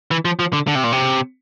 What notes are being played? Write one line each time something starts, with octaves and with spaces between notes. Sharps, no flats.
E3
F3
F3
D3
D3
C3
A#2
C3